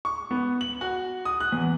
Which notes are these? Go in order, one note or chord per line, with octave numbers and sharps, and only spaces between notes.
C#6
B3
F#7
F#4
D#6
F#6
E2